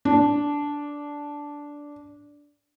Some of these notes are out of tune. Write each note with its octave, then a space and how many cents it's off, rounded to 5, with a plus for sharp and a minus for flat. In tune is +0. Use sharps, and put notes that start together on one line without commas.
D4 -10